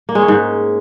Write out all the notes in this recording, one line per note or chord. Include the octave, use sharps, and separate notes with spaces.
A#3
G#3
C#4
G#2